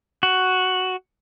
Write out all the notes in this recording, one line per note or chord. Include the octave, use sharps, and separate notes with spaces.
F#4